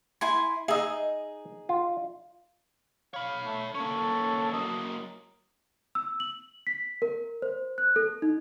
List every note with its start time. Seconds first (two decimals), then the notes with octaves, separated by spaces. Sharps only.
0.21 E4 G#5 C6
0.68 D#4 G#4 D#5 E5
1.69 F4
3.14 C#5 F5 B5
3.45 A3
3.75 A#3 C#4 A4 C#5
4.53 F#3 A#3 D#5
5.95 E6
6.20 F#7
6.67 B6
7.02 A#4
7.42 C5
7.78 F#6
7.96 A4
8.22 D#4